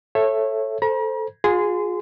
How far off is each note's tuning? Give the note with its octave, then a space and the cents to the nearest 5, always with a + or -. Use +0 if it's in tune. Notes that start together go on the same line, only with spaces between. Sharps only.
A4 +0 C#5 -20 E5 +10
A4 +0 C5 +0 A#5 +45
F4 +40 G#4 +0 C6 -25